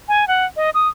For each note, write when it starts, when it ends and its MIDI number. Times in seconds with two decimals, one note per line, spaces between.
0.08 0.27 80
0.28 0.45 78
0.56 0.70 75
0.74 0.88 87